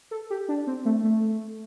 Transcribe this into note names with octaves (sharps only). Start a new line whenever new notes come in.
A4
G4
D4
C4
A3
A3